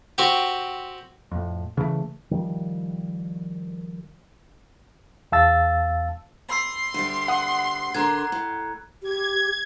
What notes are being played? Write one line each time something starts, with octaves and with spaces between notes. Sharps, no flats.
C4 F#4 G4
F2 A2
C#3 E3 F#3 A3
D#3 F3 G3
E2 F5 A5 E6 A6
B5 C6 E6 C7
D2 G3
F#5 D#6
D3 A#4 A#5 F#6 G#6
A2
G4 G#6